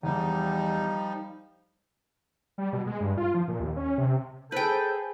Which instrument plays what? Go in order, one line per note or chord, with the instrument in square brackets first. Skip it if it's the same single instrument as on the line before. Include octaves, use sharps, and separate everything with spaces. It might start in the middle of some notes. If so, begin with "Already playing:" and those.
[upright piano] E2 [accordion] F3 G3 D#4
[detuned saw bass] G3
B2
G#3
G2
F4
F3
A#2
D#2
C#4
C3
[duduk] G#4 [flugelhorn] A4 [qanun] B4 G5 [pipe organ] C5